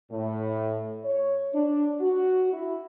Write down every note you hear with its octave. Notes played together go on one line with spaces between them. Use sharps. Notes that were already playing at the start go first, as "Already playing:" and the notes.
A2
C#5
D4
F#4
E4